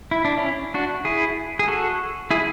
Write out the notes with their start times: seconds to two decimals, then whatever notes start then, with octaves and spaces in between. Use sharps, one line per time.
0.11 E4
0.25 D4
0.37 C#4 E4
0.74 D4 F#4
1.05 E4 G#4
1.59 G#4
1.68 F#4 A4
2.31 E4 G#4